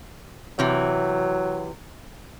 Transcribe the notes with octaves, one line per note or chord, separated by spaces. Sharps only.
C3 E3 F#3